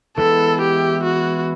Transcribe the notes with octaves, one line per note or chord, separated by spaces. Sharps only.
E3 G#3 B3 E4 A4
G4
F#4